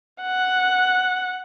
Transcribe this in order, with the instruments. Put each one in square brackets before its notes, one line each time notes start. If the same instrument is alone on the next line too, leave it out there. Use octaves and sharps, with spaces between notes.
[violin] F#5